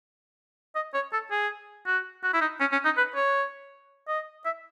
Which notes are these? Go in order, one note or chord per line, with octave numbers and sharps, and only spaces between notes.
D#5
C#5
A4
G#4
F#4
F#4
E4
D#4
C#4
C#4
D#4
B4
C#5
D#5
E5